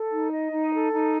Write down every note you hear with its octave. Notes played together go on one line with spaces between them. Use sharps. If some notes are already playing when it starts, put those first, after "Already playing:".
Already playing: A4
D#4
D#5
D#4
A4
D#4